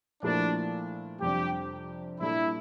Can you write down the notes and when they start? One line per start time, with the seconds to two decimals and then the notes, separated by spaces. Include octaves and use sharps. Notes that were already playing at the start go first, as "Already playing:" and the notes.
0.23 A#2 F3 A3 D4 E4 A#4
1.21 F2 C3 G3 D4 G4
2.20 A#2 G3 D4 E4 A4